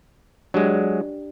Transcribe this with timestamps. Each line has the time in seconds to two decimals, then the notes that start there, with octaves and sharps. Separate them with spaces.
0.54 F#3 G#3 D4 G4